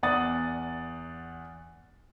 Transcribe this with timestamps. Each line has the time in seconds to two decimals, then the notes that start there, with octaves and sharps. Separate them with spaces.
0.03 E2 D5 F#5 D#6 A6